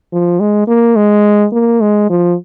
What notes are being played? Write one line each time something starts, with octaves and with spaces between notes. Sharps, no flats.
F3
G#3
A#3
G#3
A#3
G#3
F3